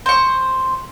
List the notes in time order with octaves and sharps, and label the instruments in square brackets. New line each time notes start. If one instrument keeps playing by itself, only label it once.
[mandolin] C5 C#6